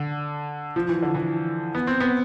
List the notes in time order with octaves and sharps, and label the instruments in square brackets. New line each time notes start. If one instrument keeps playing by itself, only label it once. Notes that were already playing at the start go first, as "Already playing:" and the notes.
Already playing: [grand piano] D3
F3
E3
D3
E3
B3
C4
B3